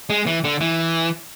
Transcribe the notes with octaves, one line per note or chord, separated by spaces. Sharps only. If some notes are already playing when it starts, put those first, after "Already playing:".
G#3
E3
D3
E3